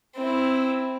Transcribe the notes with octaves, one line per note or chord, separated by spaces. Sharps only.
C4 E4